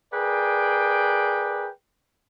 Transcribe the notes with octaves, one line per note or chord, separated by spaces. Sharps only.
G#4 A#4 B4 D5 G5